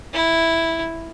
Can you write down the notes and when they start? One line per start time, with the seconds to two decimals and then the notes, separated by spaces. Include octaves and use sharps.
0.13 E4